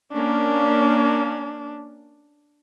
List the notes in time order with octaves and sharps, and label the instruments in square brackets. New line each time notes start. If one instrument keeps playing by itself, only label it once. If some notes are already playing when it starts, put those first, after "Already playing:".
[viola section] A#3 C#4 [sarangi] D4